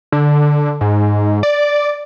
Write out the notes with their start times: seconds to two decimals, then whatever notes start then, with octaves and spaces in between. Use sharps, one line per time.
0.12 D3
0.81 G#2
1.43 D5